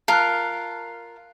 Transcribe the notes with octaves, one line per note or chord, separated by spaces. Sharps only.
F4 A#4 A5 F6 F#6